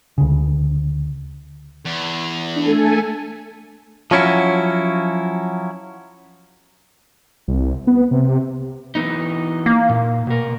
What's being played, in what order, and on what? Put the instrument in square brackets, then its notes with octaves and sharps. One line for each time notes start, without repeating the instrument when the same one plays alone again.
[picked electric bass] D2 C#3
[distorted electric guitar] E2
[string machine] A3 A4 G#5 [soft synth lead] D4
[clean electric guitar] F3 F#3 C#4 E4 F#4
[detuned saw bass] C2
B3
C3
[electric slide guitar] E3 B3 D#4
[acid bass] A#3
[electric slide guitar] A#2
B2 A#4